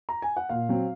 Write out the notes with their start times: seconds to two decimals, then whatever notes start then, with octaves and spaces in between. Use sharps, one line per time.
0.09 A#5
0.22 G#5
0.37 F#5
0.49 A#2 F5
0.69 F#3 C4